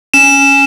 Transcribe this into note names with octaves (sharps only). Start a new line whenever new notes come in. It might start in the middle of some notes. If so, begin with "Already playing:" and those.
C#4 E7